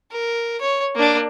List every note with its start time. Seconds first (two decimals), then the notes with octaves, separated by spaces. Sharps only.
0.11 A#4
0.61 C#5
0.96 A#3 D4